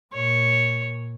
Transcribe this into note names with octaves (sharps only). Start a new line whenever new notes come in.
A#2 C#5